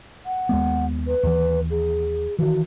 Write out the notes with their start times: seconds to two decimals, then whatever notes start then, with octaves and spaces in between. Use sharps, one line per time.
0.26 F#5
0.49 D#2 G#3 B3
1.07 B4
1.23 D#2 E3
1.70 G#4
2.39 D#3 E3 F#4